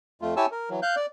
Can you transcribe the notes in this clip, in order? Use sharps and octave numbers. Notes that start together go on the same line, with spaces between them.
F2 A3 F4
E4 G4 C#5 G#5 A5 E6
A#4
E3 F#3
F5 F#6 G6
D5